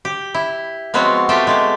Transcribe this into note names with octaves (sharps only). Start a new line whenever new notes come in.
G4
E4
F3 G#3 B3 C4 F#4 C#5
A3 F4 G4 E5 G5
G#3 A3 G4